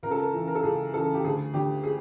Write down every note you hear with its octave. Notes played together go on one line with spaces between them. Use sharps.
C#2 A#4
A4
A#4
C#3 E3
A#4
A4
C#2 G#4
C#3 E3 A4
G4
D2 G#4
D3 G4
G#4